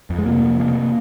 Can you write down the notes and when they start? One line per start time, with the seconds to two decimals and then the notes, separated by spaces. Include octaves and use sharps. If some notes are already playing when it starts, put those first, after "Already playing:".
0.10 F2
0.18 G#3
0.26 C3 A#3
0.43 F2
0.59 C3 A#3